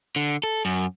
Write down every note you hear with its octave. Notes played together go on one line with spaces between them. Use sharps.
D3
A4
F#2